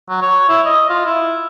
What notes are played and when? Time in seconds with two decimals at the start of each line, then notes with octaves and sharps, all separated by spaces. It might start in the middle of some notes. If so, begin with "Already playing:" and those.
0.09 F#3
0.22 C#5
0.49 E4
0.65 D#5
0.89 F4
1.06 E4